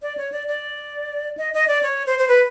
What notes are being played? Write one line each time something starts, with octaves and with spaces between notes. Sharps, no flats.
D5
C#5
D5
D5
D#5
D#5
D5
C#5
C5
C5
B4